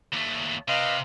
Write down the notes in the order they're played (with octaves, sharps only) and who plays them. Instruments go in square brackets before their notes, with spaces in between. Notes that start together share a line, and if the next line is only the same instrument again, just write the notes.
[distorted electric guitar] D#2 A3
[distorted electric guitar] C3 [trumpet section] B4 D#5 F5